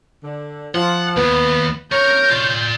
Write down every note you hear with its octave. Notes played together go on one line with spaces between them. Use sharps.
D3
F3 F#5
D#2 B3
A#4 C#5 A#5 G6
F4 D5